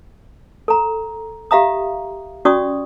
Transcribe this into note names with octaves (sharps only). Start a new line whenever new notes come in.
A4 A#5
G4 E5 F5 A#5 D#6
C#4 F#4 D5 C#6 D#6